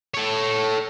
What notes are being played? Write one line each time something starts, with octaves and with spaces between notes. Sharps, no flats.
A4 C#5